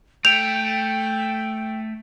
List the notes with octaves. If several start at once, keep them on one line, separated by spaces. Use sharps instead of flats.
A3 G5 G6 D7 F7